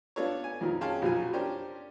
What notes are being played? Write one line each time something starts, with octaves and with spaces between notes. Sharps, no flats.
B3 D4 F4 A4 C#5
G#5
F2 A#2 D#3 F3 F#3
C#4 G#4 F5 G5 A5 C6
A#1 B2 F3 F#3 F4 G#5
C#4 D4 G4 A#4 C5